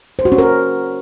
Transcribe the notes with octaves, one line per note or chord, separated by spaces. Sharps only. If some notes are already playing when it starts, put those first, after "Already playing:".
C5
F#4
C#4
A#4